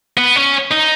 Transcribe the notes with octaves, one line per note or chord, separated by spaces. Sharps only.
B3
C#4
D#4